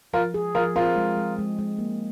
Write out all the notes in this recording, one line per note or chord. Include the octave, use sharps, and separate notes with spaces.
F3 F4 A#4
G#4
F3 F4 A#4
C4 F4 A#4
G#3
G#3
G#3
G#3
A#3